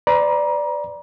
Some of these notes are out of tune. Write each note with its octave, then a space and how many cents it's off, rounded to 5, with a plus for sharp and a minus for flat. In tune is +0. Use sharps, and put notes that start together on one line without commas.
B4 +45 D5 +0 A#5 +30